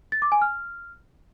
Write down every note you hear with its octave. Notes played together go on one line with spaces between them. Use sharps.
A6
D6
G#5
F6